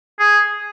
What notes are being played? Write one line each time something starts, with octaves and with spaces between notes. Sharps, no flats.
G#4